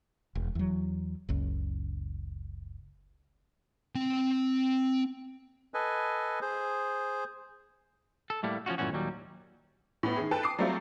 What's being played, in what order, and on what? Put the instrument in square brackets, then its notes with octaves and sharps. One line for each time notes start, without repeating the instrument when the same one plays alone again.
[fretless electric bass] E1
E2 F#3
F#1 C#2
[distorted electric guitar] C4 G5
[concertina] A4 B4 D#5 G#5
G#4 C5
[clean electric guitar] A4
A2 G3 A3 A#3
F3 C#4 D#4 F4 F#4
G2 A#2 E3 A3 C#4 F#4
D#2 A#2 F#3 G3
[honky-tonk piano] A2 B3
D#3 G#4
A4 B4 G5 A5
D6 D#6 C7
F#3 G3 A3 C4 F4 D5